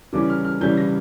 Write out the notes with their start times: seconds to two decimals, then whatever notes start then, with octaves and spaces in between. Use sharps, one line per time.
0.13 C#3 E3 G3 C#4 D6
0.30 F6
0.45 F6
0.61 C#3 E3 G3 C#4 G6
0.78 A#6